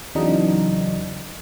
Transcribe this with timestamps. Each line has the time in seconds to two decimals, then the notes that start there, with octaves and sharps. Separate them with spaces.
0.15 E2 C#3 E3 F#3 D4 D#4